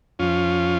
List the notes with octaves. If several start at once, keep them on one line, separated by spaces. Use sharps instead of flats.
F2 F3 C#4 F4